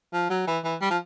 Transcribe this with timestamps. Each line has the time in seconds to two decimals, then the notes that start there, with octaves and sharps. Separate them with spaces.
0.13 F3
0.30 F#3
0.47 E3
0.64 E3
0.81 G3
0.90 F3